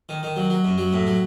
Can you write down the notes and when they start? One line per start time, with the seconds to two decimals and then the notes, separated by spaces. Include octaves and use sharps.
0.09 D#3
0.23 D#3
0.36 F#3
0.50 F#3
0.65 F#2
0.78 F#3
0.93 A2
1.07 F#3